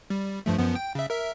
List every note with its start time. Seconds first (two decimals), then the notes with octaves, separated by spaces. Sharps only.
0.10 G3
0.46 G2 F3 A3
0.58 F#2 F3 B3
0.75 G5
0.95 C#3 E5
1.10 A#4 E5